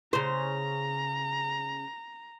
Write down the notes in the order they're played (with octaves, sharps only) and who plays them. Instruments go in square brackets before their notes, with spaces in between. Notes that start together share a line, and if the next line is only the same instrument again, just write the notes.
[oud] C#3 C5 [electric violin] A#5